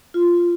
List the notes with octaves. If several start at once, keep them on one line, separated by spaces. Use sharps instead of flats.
F4